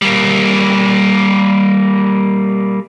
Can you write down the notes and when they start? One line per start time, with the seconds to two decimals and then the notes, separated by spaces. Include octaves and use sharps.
0.02 G3 A#3